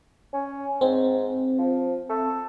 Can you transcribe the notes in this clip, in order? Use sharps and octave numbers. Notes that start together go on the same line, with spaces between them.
C#4
G#2 C4
F3
A4